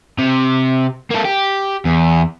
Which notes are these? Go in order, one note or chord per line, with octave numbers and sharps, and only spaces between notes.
C3
A#3 A4
G4
E2